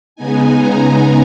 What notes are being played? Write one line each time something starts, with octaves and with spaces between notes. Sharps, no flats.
C#3 G#3 B3 D#4 G#5
A#5
G#5